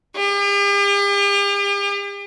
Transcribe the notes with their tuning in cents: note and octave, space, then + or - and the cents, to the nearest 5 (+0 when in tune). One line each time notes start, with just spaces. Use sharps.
G4 +45